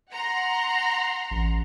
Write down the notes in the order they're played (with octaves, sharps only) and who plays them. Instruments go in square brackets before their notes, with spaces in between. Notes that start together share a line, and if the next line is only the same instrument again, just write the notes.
[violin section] F#5 A#5 C6
[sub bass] A1